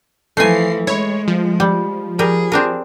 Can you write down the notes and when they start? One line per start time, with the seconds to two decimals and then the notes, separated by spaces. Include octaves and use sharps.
0.37 E3 F3 A3 G#5 C7
0.87 G#3 E4 C#5
1.28 F3
1.60 G3
2.19 G3 G#4 A#4
2.52 C4 D4 A#4